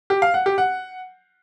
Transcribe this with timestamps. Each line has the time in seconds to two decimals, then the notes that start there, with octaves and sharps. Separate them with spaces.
0.10 G4
0.22 F5
0.34 F#5
0.46 G4
0.58 F#5